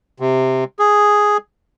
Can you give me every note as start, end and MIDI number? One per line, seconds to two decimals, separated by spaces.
0.20 0.64 48
0.79 1.37 68